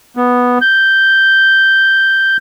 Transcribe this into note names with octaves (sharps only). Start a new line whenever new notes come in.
B3
G6